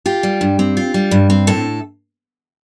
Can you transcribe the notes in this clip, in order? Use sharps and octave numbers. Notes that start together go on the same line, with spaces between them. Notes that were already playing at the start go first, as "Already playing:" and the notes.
F4 G4
G3
G2
C4
F4
G3
G2
C4
A2 A4